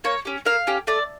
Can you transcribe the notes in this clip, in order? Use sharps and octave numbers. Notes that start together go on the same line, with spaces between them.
A#3 C#5
C#4 G4
A#3 F5
C#4 G4
A3 D5